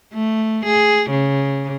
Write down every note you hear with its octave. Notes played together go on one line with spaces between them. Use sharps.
A3
G#4
C#3